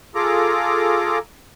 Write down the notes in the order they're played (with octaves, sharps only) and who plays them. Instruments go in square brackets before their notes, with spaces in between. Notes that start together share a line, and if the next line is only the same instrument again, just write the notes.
[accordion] F4 G#4 A4 A#5 D6